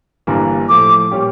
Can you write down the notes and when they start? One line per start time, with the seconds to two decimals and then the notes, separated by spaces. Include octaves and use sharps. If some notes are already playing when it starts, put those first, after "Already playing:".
0.27 G1 G2 E3 G3 A#3
0.69 A2 F3 A3 D6
1.11 A#2 G3 C#4 G4